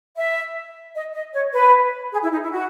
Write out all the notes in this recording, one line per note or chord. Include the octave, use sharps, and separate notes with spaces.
E5
D#5
D#5
C#5
B4
G#4
E4
D#4
E4
F#4